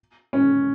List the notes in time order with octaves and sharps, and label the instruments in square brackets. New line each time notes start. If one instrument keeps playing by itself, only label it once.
[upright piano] C#4